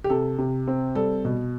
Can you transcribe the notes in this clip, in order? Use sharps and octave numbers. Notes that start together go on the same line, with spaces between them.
G4
C3 A4
C3
C4
G3 A4
B2